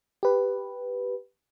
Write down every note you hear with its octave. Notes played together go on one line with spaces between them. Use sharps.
G4 B4